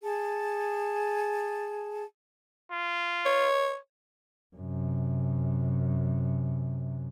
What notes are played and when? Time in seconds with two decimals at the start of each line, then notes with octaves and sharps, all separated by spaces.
0.03 G#4 A5
2.72 F4
3.25 C#5
4.56 F#2 C3